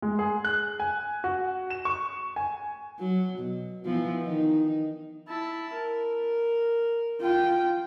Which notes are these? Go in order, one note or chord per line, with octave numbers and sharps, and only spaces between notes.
G#3
G#4
F#6
G#5
F#4
E7
C#6
G#5
F#3
B2
E3 F3 B3
D#3 D#4
E4 A5
A#4
F4 G5